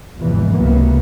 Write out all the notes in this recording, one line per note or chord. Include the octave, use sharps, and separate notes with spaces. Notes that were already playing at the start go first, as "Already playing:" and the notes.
G1 E2 G#2 C3 E3 F3
C#2 C3 E3 F#3 A#3 B3